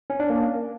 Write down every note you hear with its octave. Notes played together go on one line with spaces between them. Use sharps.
C#4
D4
A#3